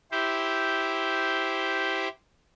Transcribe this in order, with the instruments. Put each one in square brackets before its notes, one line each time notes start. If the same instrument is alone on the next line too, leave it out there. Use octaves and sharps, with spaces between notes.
[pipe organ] E4 G4 C5